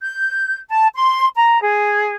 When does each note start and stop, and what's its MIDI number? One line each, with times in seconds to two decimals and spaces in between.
0.02 0.57 91
0.69 0.87 81
0.95 1.27 84
1.35 1.58 82
1.61 2.15 68